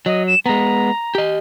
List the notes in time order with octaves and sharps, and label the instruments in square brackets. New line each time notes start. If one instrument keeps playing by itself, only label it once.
[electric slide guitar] F#3 [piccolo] D#5
[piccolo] E7
[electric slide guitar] G#3 B3 [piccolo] A#5
[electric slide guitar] G4 D#5